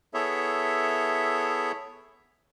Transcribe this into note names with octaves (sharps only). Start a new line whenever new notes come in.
B3 E4 G#4 A4 C#5 E5